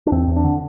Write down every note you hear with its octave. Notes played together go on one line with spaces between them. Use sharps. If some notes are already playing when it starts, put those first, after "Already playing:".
D4
E2 C4
E2
D4
D3